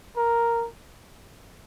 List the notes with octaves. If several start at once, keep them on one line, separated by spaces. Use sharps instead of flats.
A#4